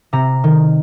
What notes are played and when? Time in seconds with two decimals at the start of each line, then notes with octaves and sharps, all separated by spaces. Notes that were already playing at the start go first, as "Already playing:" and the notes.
0.13 C3 A#5
0.44 D#3